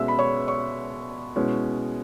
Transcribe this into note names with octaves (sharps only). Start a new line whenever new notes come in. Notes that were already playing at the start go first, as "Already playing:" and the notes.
Already playing: B2 G#3 C#4 E5 E6
B5
C#5 C#6
C#5 C#6
B2 G#3 C#4 E4